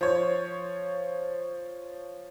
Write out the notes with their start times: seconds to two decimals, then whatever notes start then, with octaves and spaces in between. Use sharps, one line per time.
0.01 F3 C#5